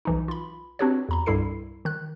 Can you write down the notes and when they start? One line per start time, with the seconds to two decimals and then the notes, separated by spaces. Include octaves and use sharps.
0.05 B1 E3 D#4
0.28 F4 B5
0.79 C4 D4 F#4 G4 B4 C#5
1.09 E2 A#5 B5
1.26 C2 G2 G3 E4 A4 C7
1.85 D#3 F#6